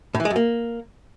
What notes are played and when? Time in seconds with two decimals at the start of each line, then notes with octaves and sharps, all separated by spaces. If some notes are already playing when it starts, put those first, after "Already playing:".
0.15 A2
0.20 E3
0.25 G#3
0.30 F#2
0.36 A#3